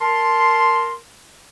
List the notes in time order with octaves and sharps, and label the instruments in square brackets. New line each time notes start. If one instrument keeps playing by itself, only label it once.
[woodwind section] A#4 A5 C6